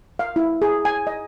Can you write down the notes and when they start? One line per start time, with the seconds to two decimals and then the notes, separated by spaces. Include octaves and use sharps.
0.19 F5
0.36 E4
0.62 G#4
0.85 G#5
1.07 D#5